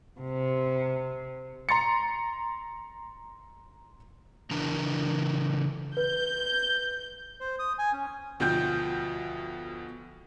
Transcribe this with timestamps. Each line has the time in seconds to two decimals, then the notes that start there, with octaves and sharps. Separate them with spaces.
0.19 C3
1.69 A#5 C6 A6 C#7
4.51 C#3 E3 D4 A#4 A5 A#5
5.97 B4 G6
7.40 C5
7.59 D#6
7.79 G#5
7.93 C#4
8.40 D2 B2 F3 G5 G6